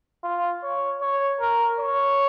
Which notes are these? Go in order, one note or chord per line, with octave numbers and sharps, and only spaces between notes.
F4
C#5
C#5
A#4
C#5